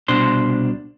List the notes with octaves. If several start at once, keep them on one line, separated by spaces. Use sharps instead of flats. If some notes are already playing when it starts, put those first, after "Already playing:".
C2 B2 D4 C5 C6